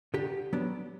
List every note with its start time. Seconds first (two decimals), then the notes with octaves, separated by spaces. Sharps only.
0.14 D3 G4
0.53 F#3 B3 D4